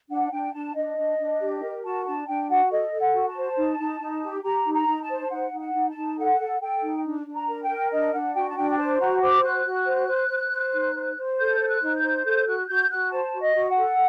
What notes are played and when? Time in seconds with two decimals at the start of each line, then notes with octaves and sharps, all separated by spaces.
0.09 D4 F#5
0.31 D4 G5
0.53 D4 A5
0.75 D4 D#5
0.97 D4
1.18 D4
1.40 G4
1.61 A#4
1.83 F#4 A5
2.04 D4 A5
2.26 D4 G5
2.48 F#4 F#5
2.70 A4 D#5
2.91 A4
2.99 F#5
3.13 F#4
3.28 A5
3.35 C5
3.56 D#4
3.78 D#4
4.00 D#4
4.22 G4
4.43 G4 A#5
4.65 D#4
4.73 A#5
4.86 D#4
5.01 A5
5.09 C5
5.30 D#4 F#5
5.52 D#4
5.59 F#5
5.74 D#4
5.88 A5
5.96 D#4
6.17 A4 F#5
6.39 A4
6.60 A4 G5
6.82 D#4
7.04 D4
7.26 D4
7.33 A#5
7.48 A#4
7.62 G5
7.69 A#4
7.91 D4 D#5
8.13 D4 F#5
8.34 F#4 G5
8.48 A5
8.56 D4 G5
8.70 G5
8.77 C5 A5
8.99 F#4 A#5
9.21 C5 D6
9.42 F#4 F#6
9.64 F#4
9.86 C5
10.08 C5
10.29 C5
10.51 C5
10.73 D#4
10.94 C5
11.17 C5
11.38 A4 G6
11.59 C5
11.66 F#6
11.82 D#4
11.96 G6
12.03 C5
12.25 A4 G6
12.46 F#4 F#6
12.68 F#4 G6
12.90 F#4 F#6
13.11 C5 A5
13.33 F#4
13.40 D#5
13.54 F#4
13.69 F#5
13.77 A4